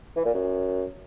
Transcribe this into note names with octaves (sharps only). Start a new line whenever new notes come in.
E3
A#2
F#2